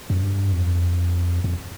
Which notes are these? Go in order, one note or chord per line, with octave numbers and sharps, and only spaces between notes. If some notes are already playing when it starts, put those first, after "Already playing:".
F#2
G2
F2
F2